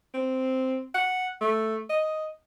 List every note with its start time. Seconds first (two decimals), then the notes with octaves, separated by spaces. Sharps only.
0.14 C4
0.94 F#5
1.41 A3
1.89 D#5